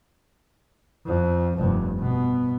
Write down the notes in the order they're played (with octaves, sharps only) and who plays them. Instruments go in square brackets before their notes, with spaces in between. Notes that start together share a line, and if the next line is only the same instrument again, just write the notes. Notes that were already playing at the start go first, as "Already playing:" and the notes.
[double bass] F2
F1 G2
B2 B3